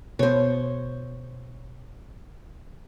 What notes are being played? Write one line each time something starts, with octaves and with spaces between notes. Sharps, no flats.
B2 C5 C#5